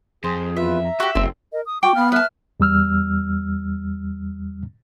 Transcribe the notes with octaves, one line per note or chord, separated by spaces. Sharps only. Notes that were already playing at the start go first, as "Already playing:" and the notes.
F2 G#4 C5
E2 F4 B4 E5
A#5
F#4 G4 E5
F#1 C4 A4
A#4 D#5
D#6
F#4 G5 C#6 D6
B3 F5 B5 F6
B4 E5 A5 F6
E2 G3 E6 F6